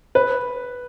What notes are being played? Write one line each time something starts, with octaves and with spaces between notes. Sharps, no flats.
B4